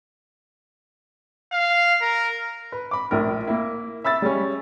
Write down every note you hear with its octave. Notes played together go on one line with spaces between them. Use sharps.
F5
A#4
B4
B5 D6
A#1 A2 A#4
A#3 E4
E5 B5 E6 A6
G3 G#3 C#4